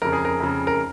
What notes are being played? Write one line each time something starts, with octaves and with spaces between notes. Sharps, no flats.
F2 C#3 A#4
G#4
A#4
F2 C#3
A#4